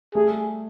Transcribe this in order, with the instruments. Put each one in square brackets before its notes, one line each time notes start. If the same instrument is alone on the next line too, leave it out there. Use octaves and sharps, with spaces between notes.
[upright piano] G3 A3 [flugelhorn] G#4